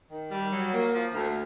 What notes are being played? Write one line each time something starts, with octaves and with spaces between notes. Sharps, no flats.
D#3
G3
F#3
A#3
F3
D2